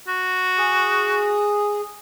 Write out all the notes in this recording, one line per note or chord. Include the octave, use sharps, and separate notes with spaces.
F#4
G#4